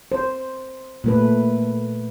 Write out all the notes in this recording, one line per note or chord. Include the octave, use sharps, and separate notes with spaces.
C5
A#2 A3 B4